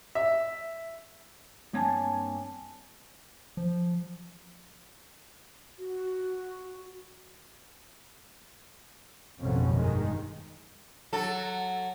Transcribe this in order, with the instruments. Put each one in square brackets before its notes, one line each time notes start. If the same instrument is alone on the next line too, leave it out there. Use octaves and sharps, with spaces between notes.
[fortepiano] E5
[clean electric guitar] G2 A#3 C4 C#5 G#5 A5
[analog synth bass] F3
[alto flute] F#4
[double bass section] A1 F2 G#2 B2 D3 C#4
G2 D#3 G#3
[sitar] F#3 A4